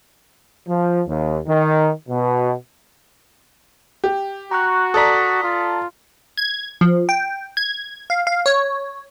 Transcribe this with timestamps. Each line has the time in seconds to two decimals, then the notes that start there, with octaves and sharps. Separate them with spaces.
0.68 F3
1.07 D#2
1.47 D#3
2.09 B2
4.04 G4
4.51 F#4 A#5 C#6 F#6
4.94 A4 D5 A#5 D#6 A6 B6
5.43 F4
6.37 G#6
6.81 F3
7.09 G5
7.57 G#6
8.10 F5
8.27 F5
8.46 C#5